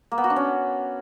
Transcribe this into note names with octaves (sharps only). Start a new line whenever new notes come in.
A#3
B3
F#4
D4
C#4